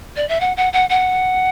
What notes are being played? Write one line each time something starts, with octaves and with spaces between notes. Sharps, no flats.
D5
E5
F#5
F#5
F#5
F#5